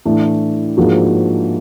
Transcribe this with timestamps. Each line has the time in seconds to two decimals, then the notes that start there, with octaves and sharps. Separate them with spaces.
0.05 A2 E3 A3 D4
0.77 G#2 F3 A#3 D4 F#4